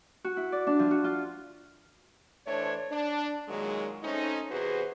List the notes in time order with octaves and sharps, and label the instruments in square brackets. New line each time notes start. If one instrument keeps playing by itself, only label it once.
[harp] F#4
E4
D5
D4
F3
F#4
F4
[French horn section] E3 A3 D4 C5 C#5
D4
A#2 D#3 F#3 G#3
A3 C4 C#4 D#4
E2 C3 F#4 G#4 B4 C5